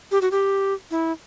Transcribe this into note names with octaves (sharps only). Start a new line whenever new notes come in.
G4
F#4
G4
E4